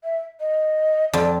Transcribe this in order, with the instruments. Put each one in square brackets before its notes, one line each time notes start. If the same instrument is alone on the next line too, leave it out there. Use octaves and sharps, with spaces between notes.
[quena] E5
D#5
[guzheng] F2 [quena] D5